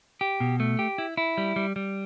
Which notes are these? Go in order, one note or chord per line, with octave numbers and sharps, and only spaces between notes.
G4
B2
A3
G4
E4
E4
G3
G3
G3